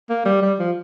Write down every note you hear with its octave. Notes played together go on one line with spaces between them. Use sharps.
A#3
G3
G3
F3